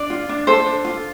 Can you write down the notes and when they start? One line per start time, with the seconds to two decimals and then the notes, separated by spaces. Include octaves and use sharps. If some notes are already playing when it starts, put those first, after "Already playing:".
Already playing: D4 D5
0.10 F4
0.29 D4
0.47 A4 C5
0.66 D4
0.85 F4